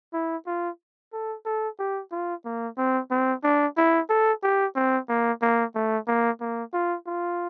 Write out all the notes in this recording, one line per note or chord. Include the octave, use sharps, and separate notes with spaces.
E4
F4
A4
A4
G4
F4
A#3
C4
C4
D4
E4
A4
G4
C4
A#3
A#3
A3
A#3
A#3
F4
F4